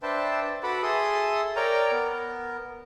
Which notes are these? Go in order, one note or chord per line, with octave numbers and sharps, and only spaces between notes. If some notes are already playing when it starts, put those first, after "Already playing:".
D4 B4 C5 E5 G5 A5
F#4 A4 B4 F#5 B5 D6
G#4 A4 E5 C6 D#6
A#4 C#5 D5 G5 A#5
B3 A#4